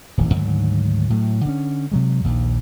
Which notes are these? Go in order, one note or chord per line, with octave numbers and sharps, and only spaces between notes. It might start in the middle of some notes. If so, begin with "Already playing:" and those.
D#1 A1 F#2 E3
D2 G#2 D#3 F#3
A2 F#3 A3
D3 C4 C#4
C3 F#3 G#3
A#1 D#2